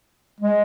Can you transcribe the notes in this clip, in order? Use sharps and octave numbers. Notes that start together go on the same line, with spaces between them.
G#3